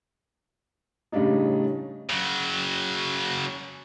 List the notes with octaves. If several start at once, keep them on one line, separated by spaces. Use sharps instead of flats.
A2 C#3 G3 D4 D#4
C#3 F#3